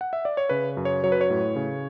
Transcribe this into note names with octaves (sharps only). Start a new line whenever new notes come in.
F#5
E5
D5
C#5
C#3 B4
F#2
C#5
F#3 C#5
B4
C#5
A2
C#3